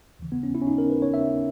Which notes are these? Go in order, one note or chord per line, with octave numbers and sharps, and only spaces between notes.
D#2 C#3 E3
B3
C#4
E4
C#4
D#4
A#4
B4
C#5
E5